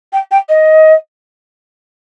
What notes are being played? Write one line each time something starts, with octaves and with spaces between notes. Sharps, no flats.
G5
G5
D#5